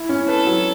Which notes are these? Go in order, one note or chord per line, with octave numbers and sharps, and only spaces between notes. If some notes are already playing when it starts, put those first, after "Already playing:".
Already playing: E4
C#4
A4 B4
F#3